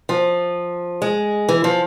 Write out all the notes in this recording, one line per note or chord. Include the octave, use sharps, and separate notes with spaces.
F3
G#3
E3
F3